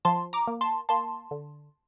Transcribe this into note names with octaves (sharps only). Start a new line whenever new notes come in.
F3 A5 C6
A#5 D6
A#3
A5 C6
A#3 A5 C6
D3